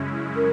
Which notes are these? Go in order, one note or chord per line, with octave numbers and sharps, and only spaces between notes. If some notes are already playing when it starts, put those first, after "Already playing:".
Already playing: F#2 C#3 G#3 C#4 E4
A#4